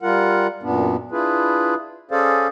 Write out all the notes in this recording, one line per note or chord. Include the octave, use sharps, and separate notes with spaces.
G3 F4 A#4 F#5
F#2 A#2 B3 D4
D4 E4 F4 G#4 B4
C#4 G#4 A4 C5 D5 F5